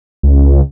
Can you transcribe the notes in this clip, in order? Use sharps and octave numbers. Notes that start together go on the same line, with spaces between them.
C#2